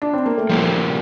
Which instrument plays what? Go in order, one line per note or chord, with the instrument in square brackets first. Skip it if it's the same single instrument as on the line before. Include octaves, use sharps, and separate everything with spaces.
[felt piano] D4
C4
A#3
A3
[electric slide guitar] F3 A#3 E4 [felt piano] G3